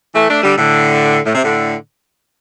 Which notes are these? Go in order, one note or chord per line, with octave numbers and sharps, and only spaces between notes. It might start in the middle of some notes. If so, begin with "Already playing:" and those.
E3 A3
A3 D4
D3 G3
A2 D3
A2
C3
A2 D3